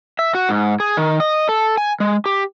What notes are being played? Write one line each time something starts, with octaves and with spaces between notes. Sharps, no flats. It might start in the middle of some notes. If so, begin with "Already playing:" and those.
E5
F#4
G#2
G#4
D#3
D#5
A4
G#5
G#3
G4